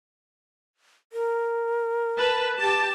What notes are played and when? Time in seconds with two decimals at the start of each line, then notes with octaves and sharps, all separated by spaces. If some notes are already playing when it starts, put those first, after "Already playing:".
1.13 A#4
2.17 B4 A5
2.56 G4 A5